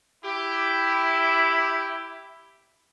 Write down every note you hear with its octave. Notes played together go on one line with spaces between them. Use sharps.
E4 G4